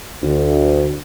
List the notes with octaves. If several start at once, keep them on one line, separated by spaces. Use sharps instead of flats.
D2